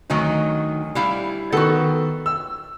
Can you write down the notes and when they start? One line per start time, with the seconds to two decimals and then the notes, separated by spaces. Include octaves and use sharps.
0.10 D2 D#3 F#3 D#4
0.95 G3 E4 F5
1.52 D#3 B3 F#4 A4
2.26 E6